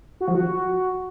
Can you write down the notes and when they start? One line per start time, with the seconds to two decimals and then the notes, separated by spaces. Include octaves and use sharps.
0.21 F#4
0.28 F3
0.35 F#4